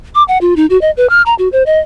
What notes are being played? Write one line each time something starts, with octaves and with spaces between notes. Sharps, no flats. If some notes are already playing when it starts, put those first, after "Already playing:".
D6
F#5
F4
D#4
F#4
D#5
B4
F6
A#5
F#4
C5
D#5